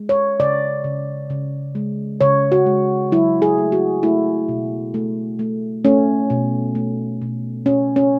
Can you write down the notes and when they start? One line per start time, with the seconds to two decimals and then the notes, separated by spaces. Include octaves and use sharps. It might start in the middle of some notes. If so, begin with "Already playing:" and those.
Already playing: G#3
0.09 C#5
0.40 C#3 D5
0.84 C#3
1.30 C#3
1.75 G#3
2.21 C#3 C#5
2.52 F#4
2.66 G#3
3.12 F#3 E4
3.42 G#4
3.58 A3
3.72 F#4
4.03 A3 E4
4.48 B2
4.94 A3
5.39 A3
5.85 A3 C#4
6.30 B2
6.75 A3
7.22 B2
7.66 B2 C#4
7.96 C#4